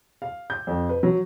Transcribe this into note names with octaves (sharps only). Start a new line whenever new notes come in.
F5
G6
F2
B4
F#3